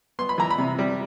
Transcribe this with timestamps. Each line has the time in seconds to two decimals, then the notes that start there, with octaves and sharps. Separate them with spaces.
0.19 B3 C6
0.29 B5
0.38 E3 A#5
0.50 B5
0.58 C3
0.79 G3